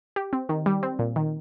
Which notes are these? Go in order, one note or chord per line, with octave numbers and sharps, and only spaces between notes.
G4
C4
D#3
G3
C4
A#2
D#3